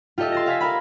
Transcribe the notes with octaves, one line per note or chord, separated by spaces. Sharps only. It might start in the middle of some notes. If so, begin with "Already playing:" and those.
F4 G4 A4 D#5 E5
C6 A6 A#6
E5 F5 G#5 B6
A#4 F5 B5